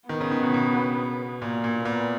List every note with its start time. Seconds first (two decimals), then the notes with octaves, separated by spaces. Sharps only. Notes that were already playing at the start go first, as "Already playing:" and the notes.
0.09 D#3 B3
0.21 C#3
0.31 D#3
0.43 B2
0.54 B2
1.42 A#2 A#3
1.64 A#2
1.85 A#2 B3